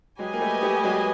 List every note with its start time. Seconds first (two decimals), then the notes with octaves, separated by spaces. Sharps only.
0.19 F#3 G#3 G4 B4 D#5 G#5
0.34 A#3
0.41 G3 A3
0.62 G3 A3
0.83 F#3 G#3